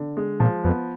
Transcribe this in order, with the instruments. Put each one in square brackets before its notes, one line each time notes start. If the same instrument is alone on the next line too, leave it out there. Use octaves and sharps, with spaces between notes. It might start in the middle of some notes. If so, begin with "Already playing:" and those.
Already playing: [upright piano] D3
G#3
[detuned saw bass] A#2 [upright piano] F3
[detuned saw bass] F2 [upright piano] B3